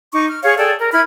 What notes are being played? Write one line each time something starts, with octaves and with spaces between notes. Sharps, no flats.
D#4 C#6 D6
F6
G#4 C#5 F5 C#6
G#4 A4 D5 G5
A#4
E4 B5 F6 G#6